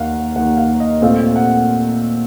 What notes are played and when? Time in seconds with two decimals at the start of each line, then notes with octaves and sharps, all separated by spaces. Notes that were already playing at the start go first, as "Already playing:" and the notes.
Already playing: D#2 D#3 A#3 F5 F#5
0.36 D#2 D#3 A#3 F#5
0.57 F5
0.80 D#5
1.02 A#2 A3 C4 F5
1.36 F#5